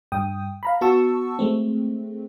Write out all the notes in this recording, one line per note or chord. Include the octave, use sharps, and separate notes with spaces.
G2 G5 D#6
F5 A#5 B5
B3 F#4 A5 C#6 E6
G#3 A3 C4